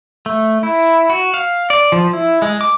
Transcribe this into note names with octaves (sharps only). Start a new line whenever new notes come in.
A3
E4
F#4
F5
D5
F3
E4
G#3
D6